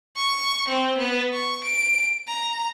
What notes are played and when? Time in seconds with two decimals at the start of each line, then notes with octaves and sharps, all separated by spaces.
0.16 C#6
0.68 C4
0.98 B3
1.33 C#6
1.64 D7
2.27 A#5